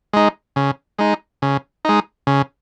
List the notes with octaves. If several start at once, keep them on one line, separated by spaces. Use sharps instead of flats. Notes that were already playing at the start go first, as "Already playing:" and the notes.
G#3 D#4
C#3
G#3 D#4
C#3
G#3 D#4
C#3